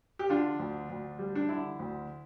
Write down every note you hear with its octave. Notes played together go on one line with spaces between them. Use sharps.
G4
D3 D4 F4
D2
D2
G3
D4
D3 E4
D2